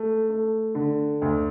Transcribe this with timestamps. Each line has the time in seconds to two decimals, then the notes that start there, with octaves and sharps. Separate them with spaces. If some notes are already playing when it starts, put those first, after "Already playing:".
Already playing: A3
0.30 A3
0.75 D3
1.22 D2